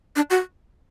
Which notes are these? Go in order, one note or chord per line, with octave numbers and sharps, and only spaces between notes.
D4
F#4